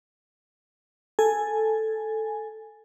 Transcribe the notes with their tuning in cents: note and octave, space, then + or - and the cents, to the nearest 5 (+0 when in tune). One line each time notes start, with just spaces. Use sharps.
A4 +0 G#5 +0